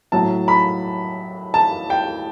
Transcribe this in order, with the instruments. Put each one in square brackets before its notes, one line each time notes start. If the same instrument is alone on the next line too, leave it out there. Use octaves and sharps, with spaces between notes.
[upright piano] A2 F#3 A5
B5
A5
G5